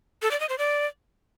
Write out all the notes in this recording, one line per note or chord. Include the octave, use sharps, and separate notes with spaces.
A4
D5
D#5
C5
D5